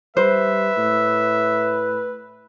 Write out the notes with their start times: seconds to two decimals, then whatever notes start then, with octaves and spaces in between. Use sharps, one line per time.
0.17 G3 B4 C5 E5
0.77 A2